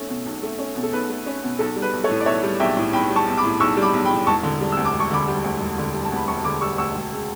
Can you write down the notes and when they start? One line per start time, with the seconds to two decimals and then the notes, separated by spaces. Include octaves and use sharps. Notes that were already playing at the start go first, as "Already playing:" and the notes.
Already playing: B1 A3 C#4
0.09 B2
0.26 B1
0.43 A3
0.59 C#4
0.76 B2
0.83 A4
0.92 B1 B4
1.09 A3
1.26 C#4
1.43 B2
1.59 B1 A4
1.76 G3
1.82 B4
1.93 B1
2.04 A4 C#5
2.09 A2
2.20 D5
2.26 B1 C#5 E5
2.43 G3
2.60 B1 E5 G5
2.77 A2
2.93 B1 G5 B5
3.10 G3
3.16 A5 C#6
3.27 B1
3.37 B5 D6
3.44 A2
3.60 B1 C#6 E6
3.77 G3
3.82 B5 D6
3.94 B1
4.05 G5 B5
4.10 A2
4.27 E1 A5 C#6
4.43 D3
4.61 G3
4.72 D2 E6
4.85 D6
4.94 E1
5.00 C#6
5.11 D3 B5 D6
5.28 G3
5.44 D2
5.61 E1
5.78 D3
5.94 G3
6.04 A5
6.12 D2 B5
6.28 E1 A5 C#6
6.44 D3 B5 D6
6.61 G3 C#6 E6
6.78 D2 C#6 E6
6.95 E1
7.12 C#3